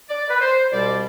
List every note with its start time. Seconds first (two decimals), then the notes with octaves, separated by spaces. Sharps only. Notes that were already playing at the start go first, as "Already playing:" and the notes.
0.09 D5
0.29 B4
0.40 C5
0.71 C2 B2 G3 D5